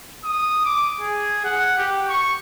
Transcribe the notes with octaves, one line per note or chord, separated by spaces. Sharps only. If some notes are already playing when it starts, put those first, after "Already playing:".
D#6
D6
G#4
F#5
G4
C#6